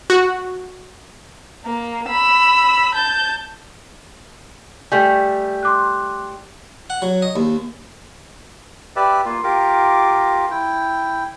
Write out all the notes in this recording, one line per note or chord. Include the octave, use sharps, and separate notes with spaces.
F#4
A#3
B5 E6
A5 G6
G3 A3 G#5
C6 D6 F#6
F#5
F#3
D#5
D#2
G4 B4 D5 E5
A#3 F4
F4 G4 A#4 D6
E4 G5